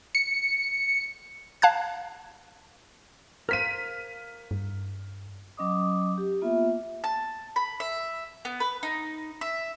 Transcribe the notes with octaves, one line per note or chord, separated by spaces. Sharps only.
C#7
F5 A5 F#6 G#6
A#4 C5 F5 F6 B6 D#7
G2
F#3 C#4 D#5 D6 D#6
G4
A#3 B3 F4 E5
A5
B5
E5
B3
B4
D#4
E5